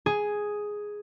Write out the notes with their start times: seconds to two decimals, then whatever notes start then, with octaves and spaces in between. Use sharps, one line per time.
0.06 G#4